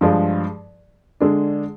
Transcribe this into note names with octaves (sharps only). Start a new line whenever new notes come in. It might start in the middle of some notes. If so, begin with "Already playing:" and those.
G2 F3 G#3
D3 G#3 D4